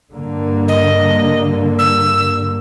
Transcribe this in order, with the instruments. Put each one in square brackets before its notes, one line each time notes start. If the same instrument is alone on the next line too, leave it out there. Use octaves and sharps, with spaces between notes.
[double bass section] G2 D3 A#3
[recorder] D#5
E6